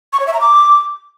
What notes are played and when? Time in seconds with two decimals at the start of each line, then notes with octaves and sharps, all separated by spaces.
0.13 C#6
0.20 C#5
0.27 E5
0.34 A#5
0.41 D6